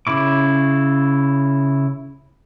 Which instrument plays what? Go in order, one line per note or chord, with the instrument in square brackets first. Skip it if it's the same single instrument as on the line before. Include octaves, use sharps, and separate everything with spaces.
[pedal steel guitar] C#3 E4 D6